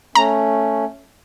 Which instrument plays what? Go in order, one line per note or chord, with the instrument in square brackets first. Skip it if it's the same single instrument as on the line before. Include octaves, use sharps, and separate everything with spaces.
[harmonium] A3 C#4 [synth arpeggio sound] A#5